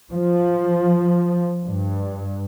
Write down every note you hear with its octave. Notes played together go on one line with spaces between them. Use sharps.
F3
G2